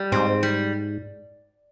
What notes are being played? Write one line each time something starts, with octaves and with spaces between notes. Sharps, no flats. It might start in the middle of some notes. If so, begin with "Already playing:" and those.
Already playing: G3
G#2 C4
G3